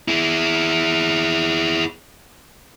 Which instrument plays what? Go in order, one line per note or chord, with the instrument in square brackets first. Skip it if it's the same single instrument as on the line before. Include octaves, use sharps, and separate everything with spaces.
[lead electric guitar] E4 G#4